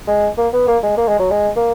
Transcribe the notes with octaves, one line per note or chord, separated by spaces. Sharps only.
G#3
A#3
B3
A#3
G#3
A#3
G#3
F#3
G#3
A#3